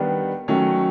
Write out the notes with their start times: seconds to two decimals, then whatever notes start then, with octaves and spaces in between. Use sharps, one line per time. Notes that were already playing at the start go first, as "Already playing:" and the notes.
Already playing: D#3 G3 B3 D4
0.48 D#3 F#3 A3 C#4